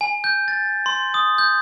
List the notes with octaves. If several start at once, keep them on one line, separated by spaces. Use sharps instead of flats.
G#5
G6
A6
C6
D#6
G6